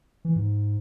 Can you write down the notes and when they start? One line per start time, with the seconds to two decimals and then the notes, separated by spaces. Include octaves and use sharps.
0.25 E3
0.36 G#2